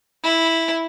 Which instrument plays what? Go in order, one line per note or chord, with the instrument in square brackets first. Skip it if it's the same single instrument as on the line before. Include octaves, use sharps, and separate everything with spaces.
[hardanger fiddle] E4